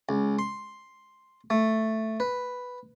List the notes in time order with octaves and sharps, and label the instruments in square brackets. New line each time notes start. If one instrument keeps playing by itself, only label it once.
[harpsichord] C#2
C6
A3
B4